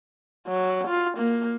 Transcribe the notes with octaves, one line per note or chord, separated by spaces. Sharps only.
F#3
F4
A#3